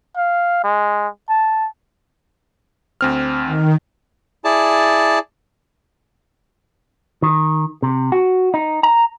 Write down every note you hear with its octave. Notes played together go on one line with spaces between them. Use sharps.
F5
G#3
A5
D2 C4 F6
D#3
E4 G#4 D5 A5
D#3
C3
F#4
D#4
A#5